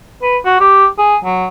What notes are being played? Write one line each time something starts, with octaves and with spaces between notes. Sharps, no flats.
B4
F#4
G4
G#4
F#3